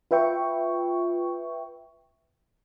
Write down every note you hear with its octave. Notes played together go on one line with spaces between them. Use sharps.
F4 B4 E5 G5 C#6